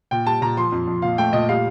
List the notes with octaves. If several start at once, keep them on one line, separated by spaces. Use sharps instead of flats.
A#2 G5
G3 A5
A#2 A#5
F3 C6
F2
F2
A#2 F5
A3 G5
A#2 D#5
G3 F5